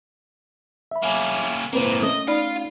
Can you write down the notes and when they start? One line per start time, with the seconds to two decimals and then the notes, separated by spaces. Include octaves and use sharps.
0.91 E5 B5
1.03 A#3 C#4
1.73 A2 A#3 C4 B4 C5
2.03 A3 C#4 D#5
2.28 D#4 F4 D5 F5 B5